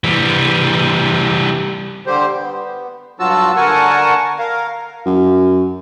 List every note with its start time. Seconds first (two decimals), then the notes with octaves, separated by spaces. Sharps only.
0.04 E3 G3
2.06 D3 G3 G4 C5
2.36 B3
3.20 G2 F#3 F4 F#4 A5 E6
3.56 D3 A#4 F#5 G#5 A5 C#6
4.39 A#4 F5
5.06 F#2